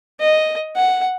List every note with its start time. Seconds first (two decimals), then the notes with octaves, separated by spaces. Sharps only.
0.20 D#5
0.76 F#5